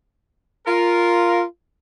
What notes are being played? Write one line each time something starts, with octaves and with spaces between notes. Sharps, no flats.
F4 A#4